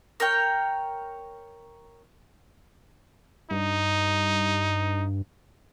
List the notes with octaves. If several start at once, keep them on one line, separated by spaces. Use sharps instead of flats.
A#4 C#5 G5
G2 D#4